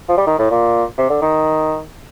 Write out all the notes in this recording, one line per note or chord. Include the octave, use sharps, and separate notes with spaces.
F3
G3
D#3
A2
A#2
C3
D3
D#3